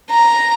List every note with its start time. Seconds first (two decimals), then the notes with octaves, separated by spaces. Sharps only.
0.11 A#5